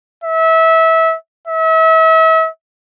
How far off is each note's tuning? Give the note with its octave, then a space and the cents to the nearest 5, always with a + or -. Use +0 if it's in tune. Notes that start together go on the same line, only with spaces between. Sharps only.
E5 -25
E5 -35